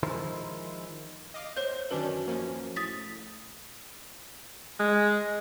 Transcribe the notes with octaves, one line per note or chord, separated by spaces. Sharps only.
D#3 F3 G#3 E4 A#4 C5
D#5 F5 D6
C5 C#5 G6
F#2 D#3 C#4 D4 B4
F3 A#3 C#4
A2 D#6 A6 B6
G#3